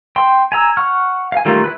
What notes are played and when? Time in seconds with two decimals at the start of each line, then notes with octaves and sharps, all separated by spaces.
0.16 G5 C6
0.52 G#5 A#5 E6
0.77 F#5 C#6 F6
1.32 F5 G#5
1.45 D#3 G3 A3 A#3 F4
1.64 E4 G4 B4